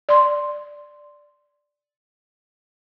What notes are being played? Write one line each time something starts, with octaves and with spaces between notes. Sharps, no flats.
D5 C6